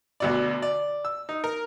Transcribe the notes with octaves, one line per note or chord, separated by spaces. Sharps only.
D2 B2 D5
D5
E6
D#4
A#4